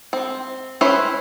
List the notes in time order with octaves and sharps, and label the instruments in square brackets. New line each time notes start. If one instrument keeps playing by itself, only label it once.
[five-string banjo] C4
C#4 E4 B4 C5